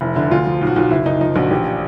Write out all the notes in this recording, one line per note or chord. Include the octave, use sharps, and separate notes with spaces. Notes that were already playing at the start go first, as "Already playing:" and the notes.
F1 E4
D3 E4
D2 F4
F3
B1
F#4
B1 F4
F#1 E4
F#1 D#4
F3 D#4
A#1 F#4
A1 G4